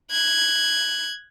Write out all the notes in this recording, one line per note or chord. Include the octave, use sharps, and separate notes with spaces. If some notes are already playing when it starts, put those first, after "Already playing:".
F#6 G#6